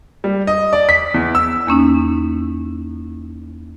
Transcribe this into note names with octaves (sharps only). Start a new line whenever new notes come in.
G3
D#5
D5
B6
E2
E6
E2 A#3 C#4 D#4